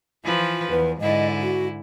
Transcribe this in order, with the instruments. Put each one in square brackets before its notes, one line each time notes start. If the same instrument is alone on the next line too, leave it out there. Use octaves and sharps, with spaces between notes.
[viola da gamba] E3 F3 B4 [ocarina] F4
[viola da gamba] E2 [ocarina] B4
[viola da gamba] G#2 D3 E4 [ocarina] D#5
[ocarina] F#4